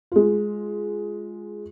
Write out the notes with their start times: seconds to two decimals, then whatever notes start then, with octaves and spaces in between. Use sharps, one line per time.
0.12 G#3 F4